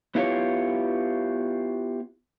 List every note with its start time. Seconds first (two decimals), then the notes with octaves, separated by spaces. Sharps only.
0.15 B3 E4 F4 G4 C#5